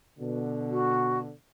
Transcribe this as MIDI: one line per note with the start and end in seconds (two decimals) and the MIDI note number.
0.19 1.31 47
0.19 1.31 50
0.71 1.20 66